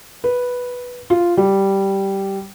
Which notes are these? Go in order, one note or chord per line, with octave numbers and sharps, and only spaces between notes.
B4
F4
G3